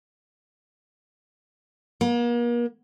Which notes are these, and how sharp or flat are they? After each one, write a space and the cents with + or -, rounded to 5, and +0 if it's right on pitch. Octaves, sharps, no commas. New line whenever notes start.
A#3 +40